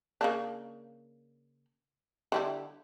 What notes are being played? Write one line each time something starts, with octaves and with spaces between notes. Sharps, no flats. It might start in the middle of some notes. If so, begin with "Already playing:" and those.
C#3 A#3 D4
D3 G3 E4